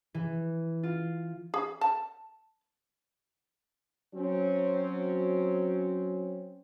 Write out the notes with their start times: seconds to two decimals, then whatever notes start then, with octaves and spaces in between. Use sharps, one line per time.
0.14 E3
0.83 F4
1.54 G#4
1.81 A5
4.14 F#3 C4 C#4